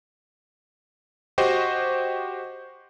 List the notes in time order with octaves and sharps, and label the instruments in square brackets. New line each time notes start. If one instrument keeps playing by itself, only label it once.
[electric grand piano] F#4 G4 C5 D#5 G5